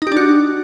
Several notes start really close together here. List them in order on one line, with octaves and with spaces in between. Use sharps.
D#4 G4 D4 F#4